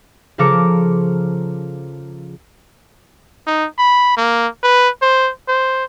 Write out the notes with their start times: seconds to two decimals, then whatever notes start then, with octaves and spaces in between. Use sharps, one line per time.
0.38 C#3 F3 A4 A#4 D6 C#7
3.47 D#4
3.79 B5
4.17 A#3
4.63 B4
5.02 C5
5.48 C5